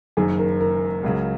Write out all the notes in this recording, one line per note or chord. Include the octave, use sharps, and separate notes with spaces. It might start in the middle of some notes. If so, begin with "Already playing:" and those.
F#1 F#2 D#3 G#4
A#4
A#4
C#2 C#3 F#3